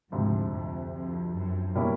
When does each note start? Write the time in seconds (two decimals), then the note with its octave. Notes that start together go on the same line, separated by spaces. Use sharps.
0.12 D2 G#2 C3 F3
0.53 F2
0.94 F2
1.34 F#2
1.75 B2 G3 A#3 C#4 E4